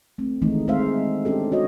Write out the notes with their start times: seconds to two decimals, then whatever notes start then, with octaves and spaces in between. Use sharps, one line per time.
0.18 A3 C4
0.42 D#3 E3 G#3 A3 B3 D#4
0.68 G#3 C4 D#4 C5 E5 F5
1.25 C#4 D4 G4 A4
1.52 F#4 C#5 D#5